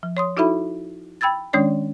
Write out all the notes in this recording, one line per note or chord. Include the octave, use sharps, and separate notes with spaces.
F3
C#5 C6 D#6
D#4 E4 F#4 A4 E5 B5
G5 B5 E6 G#6 A6
D#3 G#3 C#4 D4 C#5 D5